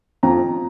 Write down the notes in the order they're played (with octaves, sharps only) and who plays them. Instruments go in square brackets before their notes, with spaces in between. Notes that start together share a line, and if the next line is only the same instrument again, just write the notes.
[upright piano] F2 A#5